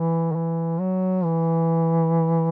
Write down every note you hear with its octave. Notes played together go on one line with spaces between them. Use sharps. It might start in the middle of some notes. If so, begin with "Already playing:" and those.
Already playing: E3
D#3
E3
F#3
E3